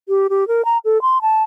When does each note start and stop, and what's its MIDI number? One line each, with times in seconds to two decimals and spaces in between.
0.09 0.28 67
0.30 0.47 67
0.48 0.65 70
0.65 0.78 82
0.85 1.01 69
1.02 1.22 84
1.22 1.43 81